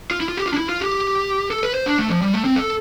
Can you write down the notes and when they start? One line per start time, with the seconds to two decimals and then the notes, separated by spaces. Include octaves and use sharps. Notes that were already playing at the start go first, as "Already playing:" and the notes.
0.11 F4
0.20 E4
0.29 F4
0.37 G4
0.46 F4
0.53 D4
0.57 E4
0.69 F4
0.81 G4
1.51 A4
1.63 B4
1.74 C5
1.86 D4
1.98 A3
2.09 F3
2.22 G3
2.33 A3
2.45 C4
2.56 A4